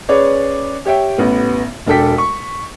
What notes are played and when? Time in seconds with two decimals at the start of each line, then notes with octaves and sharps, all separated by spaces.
0.09 C#4 G#4 B4 C#5 D5
0.85 G4 C#5 E5 G5
1.18 A1 B3
1.86 E1 D4 A4 G5 B6
2.18 C#6